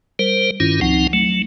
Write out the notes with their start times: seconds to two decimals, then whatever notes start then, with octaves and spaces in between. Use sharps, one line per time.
0.19 G3 A#4 C5
0.60 G2 D#3 C#4 E4 F4
0.81 C#2 F3 C4 D#4 F#5
1.13 F#3 A3